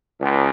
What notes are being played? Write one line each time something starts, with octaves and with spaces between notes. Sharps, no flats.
C#2